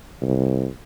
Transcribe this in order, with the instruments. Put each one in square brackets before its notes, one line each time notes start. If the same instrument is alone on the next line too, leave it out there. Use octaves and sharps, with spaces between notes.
[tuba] C2